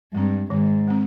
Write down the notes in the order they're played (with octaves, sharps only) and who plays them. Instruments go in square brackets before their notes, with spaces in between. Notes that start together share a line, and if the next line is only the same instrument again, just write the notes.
[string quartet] G2 [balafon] G#3 C4
[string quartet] G#2 [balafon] D#3
[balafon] G#3 C4